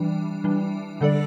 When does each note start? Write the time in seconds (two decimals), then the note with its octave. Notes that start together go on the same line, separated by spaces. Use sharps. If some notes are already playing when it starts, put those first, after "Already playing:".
Already playing: E3 G3 D4
0.44 E3 G3 D4
1.01 D3 G3 D4 A4 D5